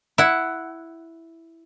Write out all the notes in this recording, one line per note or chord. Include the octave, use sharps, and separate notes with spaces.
E4 F#5